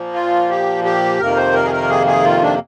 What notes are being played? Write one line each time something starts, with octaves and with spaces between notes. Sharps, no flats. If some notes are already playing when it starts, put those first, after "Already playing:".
Already playing: A#2 F3 A#3
F4
G4
G4
F2 C3 D#3 A#3 A#4
C5
A#4
G#4
A#4
G#4
G#4
F4
D4